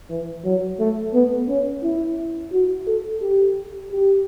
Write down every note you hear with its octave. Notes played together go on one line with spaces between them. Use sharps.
E3
F#3
A3
B3
C#4
E4
F#4
A4
G4
G4